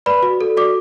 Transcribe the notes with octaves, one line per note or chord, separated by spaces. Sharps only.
B4 D5 B5
F#4
A4
F#4 D5 D6